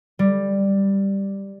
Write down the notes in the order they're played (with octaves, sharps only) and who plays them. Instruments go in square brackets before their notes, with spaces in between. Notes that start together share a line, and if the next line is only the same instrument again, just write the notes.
[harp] G3